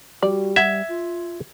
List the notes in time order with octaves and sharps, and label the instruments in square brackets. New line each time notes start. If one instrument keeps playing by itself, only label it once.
[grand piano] G3 [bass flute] F#4 [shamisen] D5
[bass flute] G3 [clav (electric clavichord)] E5 [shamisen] F#5 [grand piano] G#6
[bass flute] F4